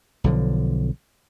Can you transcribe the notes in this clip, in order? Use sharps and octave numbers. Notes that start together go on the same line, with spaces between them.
B1 D3 F3